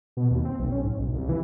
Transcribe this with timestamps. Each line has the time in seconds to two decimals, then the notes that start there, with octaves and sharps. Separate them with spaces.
0.17 B2
0.31 D#2
0.45 C4
0.59 B1
0.72 C#4
0.83 G#2
0.99 B1
1.14 C2
1.29 E3